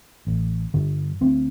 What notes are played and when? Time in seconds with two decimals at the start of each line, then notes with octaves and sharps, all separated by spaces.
0.27 A1
0.74 G2 D3
1.21 D2 C4